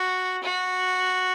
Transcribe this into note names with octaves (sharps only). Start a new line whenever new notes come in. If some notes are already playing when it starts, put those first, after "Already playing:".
Already playing: F#4
F#4